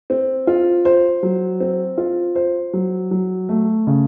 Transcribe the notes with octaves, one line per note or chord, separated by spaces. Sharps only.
C4
F4
C5
F#3
C4
F4
C5
F#3
F#3
A3
C#3